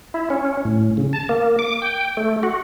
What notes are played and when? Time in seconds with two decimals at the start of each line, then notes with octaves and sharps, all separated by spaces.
0.14 E4
0.30 C#4
0.65 A2
0.97 C#3
1.13 A5
1.29 A#3
1.59 D6
1.82 G5
2.17 A3
2.43 F#4